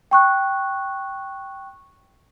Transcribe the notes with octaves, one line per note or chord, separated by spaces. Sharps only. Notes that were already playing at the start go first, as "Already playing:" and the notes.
G5 C#6 F#6